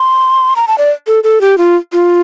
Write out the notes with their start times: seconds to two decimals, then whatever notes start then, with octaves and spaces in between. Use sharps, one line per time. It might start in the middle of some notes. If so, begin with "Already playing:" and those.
Already playing: C6
0.56 A#5
0.68 A5
0.78 D5
1.07 A4
1.24 A4
1.41 G4
1.58 F4
1.92 F4